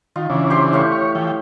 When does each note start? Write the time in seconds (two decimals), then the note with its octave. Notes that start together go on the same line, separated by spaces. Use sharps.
0.16 D#3 F4
0.30 C#3 E3 D4
0.50 G4 C5 C6
0.73 A2 F5 C#6
0.92 C#5
1.15 E3 F3 G5